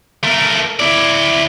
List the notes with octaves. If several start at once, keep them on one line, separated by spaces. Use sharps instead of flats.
A3 A#4
E4 D5